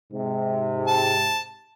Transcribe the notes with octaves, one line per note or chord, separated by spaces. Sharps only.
G#2 C3
A5